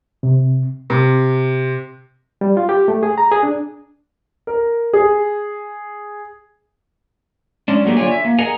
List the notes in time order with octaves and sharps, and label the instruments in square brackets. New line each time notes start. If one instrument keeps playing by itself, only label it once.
[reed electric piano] C3
[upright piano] C3
[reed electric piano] G3
F4
G4
A3
G#4
A#5
G#4
D4
[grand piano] A#4
G#4
[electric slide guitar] G#3 C#4 D4
F#3 A3 A#3 G4 G#4
D3 A#3 F4 C#5 D5 G#5
E5
A#3
G#4 A#4 D#5 F#5 G#5 A#5